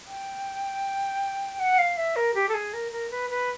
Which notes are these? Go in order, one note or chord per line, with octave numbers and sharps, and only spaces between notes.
G5
F#5
F5
E5
A#4
G4
A4
G#4
A#4
A#4
B4
B4